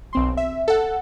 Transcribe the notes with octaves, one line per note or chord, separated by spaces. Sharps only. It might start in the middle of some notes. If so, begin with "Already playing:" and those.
B1 C4 C6
E5
A4 F#5